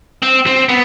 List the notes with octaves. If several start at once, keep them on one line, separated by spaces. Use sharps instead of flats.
C4
C4
B3